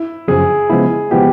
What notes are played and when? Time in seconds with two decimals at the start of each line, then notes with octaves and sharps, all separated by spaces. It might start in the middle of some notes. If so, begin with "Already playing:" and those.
Already playing: E4
0.28 F#2 C#3 F3 G#4
0.70 C#3 F3 G#3 B3 E4
1.11 C#3 F3 G#3 B3 E4 G4